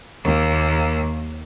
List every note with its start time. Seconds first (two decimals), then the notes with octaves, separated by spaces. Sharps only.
0.23 D#2 A#3